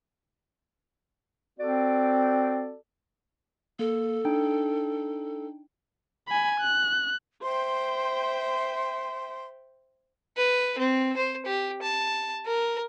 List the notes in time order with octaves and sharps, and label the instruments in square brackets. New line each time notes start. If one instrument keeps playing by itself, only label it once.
[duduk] C4 [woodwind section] F#4 A4 D5
[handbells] A#3 [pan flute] A4
[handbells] D4 D#4 G5
[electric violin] G#5 B5
F#6
[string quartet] C5 E5 G5 [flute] C6
[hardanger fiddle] B4
C4
C5
G4
A5
A#4